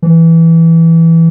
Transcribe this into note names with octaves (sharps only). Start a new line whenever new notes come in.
E3